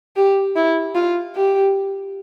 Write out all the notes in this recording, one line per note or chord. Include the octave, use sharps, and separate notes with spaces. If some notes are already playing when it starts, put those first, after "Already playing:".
G4
E4
F4
G4